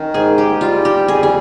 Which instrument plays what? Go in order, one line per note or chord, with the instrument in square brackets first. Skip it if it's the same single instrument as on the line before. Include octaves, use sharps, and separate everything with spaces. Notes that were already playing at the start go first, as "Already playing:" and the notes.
Already playing: [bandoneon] D#3 [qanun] C#4 D#4
[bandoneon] G#2 [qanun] G#4
[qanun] G4
[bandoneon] G3 [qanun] F4
[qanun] G4
[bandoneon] F2 [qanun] G#4
[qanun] G#4